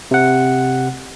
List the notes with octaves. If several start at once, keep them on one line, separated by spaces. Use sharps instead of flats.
C3 F#5